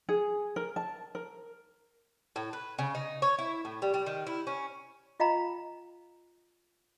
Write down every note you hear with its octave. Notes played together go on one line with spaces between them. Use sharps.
G#4
A#4
A5
A#4
A2
B4
C#3
D#4
C#5
E4
A2
G3
G3
D#3
E4
C#4
F4 D#5 F5 G5 A#5 B5